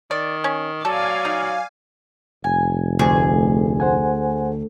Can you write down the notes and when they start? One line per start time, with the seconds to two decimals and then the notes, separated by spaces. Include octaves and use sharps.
0.11 D#3 D5
0.44 C#4
0.85 F#3 A4 D5 F5 G#5
1.25 D#4
2.44 F1 G#5
2.99 D2 G#4
3.80 C5 F#5 G#5